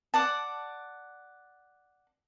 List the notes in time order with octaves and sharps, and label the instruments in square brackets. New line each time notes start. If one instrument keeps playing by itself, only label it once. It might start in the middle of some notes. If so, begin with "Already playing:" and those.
[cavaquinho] D5 F#5 A5